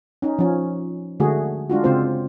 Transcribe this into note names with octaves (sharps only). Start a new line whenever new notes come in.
C#4 D#4
F3 C#4
D3 G#3 A3 F#4 G#4
G#3 D4 F4 F#4
C#3 G#3 C4 F4 C5